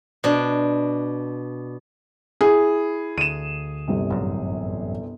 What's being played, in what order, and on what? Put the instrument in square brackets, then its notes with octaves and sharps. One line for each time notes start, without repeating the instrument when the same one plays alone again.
[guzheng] B2 D4
[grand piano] E4 [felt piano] G#4
[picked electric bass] D2 [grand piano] D#7 E7
[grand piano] G1 C2 C3
[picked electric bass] A1 F#2